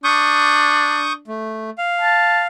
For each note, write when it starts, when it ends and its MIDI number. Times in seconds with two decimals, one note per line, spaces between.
0.04 1.27 62
0.04 1.13 85
0.04 1.13 87
0.04 1.13 91
1.28 1.70 57
1.78 2.47 77
2.01 2.42 81